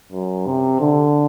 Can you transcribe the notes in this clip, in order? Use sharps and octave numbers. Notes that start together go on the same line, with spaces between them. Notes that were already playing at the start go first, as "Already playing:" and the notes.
F#2
C3
D3